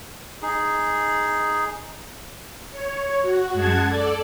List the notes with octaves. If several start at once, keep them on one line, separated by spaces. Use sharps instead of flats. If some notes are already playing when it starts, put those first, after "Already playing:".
D#4 G#4
C#5
F#4
F#2 G#3 F#5 A5 G#6
A4 D5